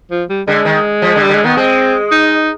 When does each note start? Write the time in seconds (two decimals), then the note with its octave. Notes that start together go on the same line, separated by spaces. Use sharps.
0.11 F3
0.29 G3
0.47 D3 G#3
0.65 D#3
1.02 F3
1.16 D3
1.22 G3
1.29 D3
1.34 G#3
1.43 D#3 B3
1.57 G#3 C4
2.12 D#4